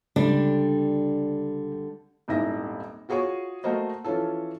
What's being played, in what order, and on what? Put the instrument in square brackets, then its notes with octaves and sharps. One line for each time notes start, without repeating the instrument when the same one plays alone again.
[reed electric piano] C#2 [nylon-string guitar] D3 G3 D4
[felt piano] D#1 G#1 E4 E5 A#6
F4 F#4 G#4 C#5 C#6
A3 A#3 F#4 C5 D#5
E3 F3 C#4 F4 A4